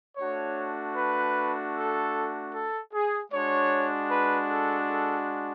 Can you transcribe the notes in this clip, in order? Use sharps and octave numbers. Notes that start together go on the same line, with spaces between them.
A3 D4 F#4 C#5
B4
A4
A4
G#4
G#3 D4 F#4 C#5
B4
A4
A4